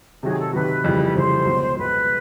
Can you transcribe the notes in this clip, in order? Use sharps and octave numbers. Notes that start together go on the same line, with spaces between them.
C3 D#3 F#3 G#4
A4
C3 D#3 F#3 B4
F2 C#3 E3 G3
B4
F2 C#3 E3 G3 C5
C#2 B2 F#3
C#2 B2 F#3 B4